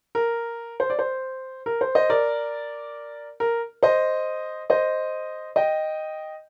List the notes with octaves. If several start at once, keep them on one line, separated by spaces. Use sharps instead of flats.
A#4
C5
D5
C5
A#4
C5
C5 D#5
A#4 D5
A#4
C5 D#5
C5 D#5
D#5 G5